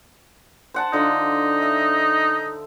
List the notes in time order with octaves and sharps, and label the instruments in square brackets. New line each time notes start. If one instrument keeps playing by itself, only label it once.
[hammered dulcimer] C5 F#5 A5
[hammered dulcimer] D3 F4 [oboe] D#4
[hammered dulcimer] E5